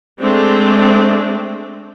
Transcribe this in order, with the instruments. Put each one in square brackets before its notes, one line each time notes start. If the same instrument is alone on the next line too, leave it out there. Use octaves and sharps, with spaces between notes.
[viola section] G#3 A3 C4 D4